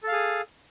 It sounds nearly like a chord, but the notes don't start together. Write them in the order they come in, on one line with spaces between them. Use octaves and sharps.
A4 F5 G#4